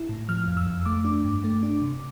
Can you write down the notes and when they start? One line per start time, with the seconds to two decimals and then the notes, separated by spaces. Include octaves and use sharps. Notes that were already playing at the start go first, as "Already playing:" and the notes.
Already playing: E4
0.09 A2
0.29 F3 F6
0.48 F2
0.57 E6
0.67 F2
0.86 A3 D6
1.05 D4
1.24 G2
1.44 A3
1.63 D4
1.82 C3